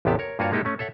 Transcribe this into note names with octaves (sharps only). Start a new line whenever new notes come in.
A1 E2 C3 B3 G4 A5
A#4 C#5
G2 A#3 F4 F#4 C#5 F5
G#3 A#3 D#4 E4 G4 A4
A3 C#4
A4 C#5 E5 F#5